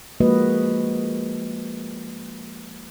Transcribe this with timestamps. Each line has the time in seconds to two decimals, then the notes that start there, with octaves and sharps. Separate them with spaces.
0.20 F3 G#3 A#3 F#4 B4 D#5